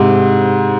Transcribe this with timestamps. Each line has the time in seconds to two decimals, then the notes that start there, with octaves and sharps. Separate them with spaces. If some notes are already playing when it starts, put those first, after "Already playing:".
Already playing: G#2 C3